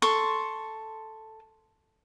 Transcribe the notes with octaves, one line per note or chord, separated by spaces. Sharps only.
A4 C6 C#6